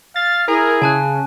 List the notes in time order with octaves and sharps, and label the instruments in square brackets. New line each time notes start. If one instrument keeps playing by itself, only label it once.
[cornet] F5 [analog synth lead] A6
[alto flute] E4 [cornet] G#4 [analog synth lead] A#4
[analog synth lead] C#3 [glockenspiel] G#5 A5 F#6